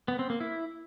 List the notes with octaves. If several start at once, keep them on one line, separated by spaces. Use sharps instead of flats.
B3
C4
A#3
E4